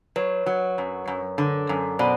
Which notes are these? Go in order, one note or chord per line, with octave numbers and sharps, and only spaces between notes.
F#3 B4 C#5
F#3
F#2
F#2
D3
F#2
B2 C5 D5